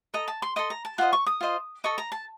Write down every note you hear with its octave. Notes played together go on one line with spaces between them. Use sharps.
A4 D#5 A#5
A5
C6
A4 D#5 C6
A#5
A5
F4 C5 D#5 F#5
C#6
D#6
F4 C5 D#5
A4 D#5 C#6
A#5
A5